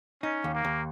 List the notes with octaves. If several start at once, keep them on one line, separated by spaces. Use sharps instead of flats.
C#4 D#4
D#2
A#3
D#2